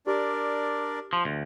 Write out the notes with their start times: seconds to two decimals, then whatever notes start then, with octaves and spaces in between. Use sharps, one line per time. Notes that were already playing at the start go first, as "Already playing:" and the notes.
0.07 D4 G4 A#4 D5
1.13 F3
1.25 D2